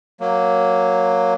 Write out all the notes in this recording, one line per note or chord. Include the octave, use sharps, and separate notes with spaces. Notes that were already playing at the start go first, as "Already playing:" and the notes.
F#3 A#3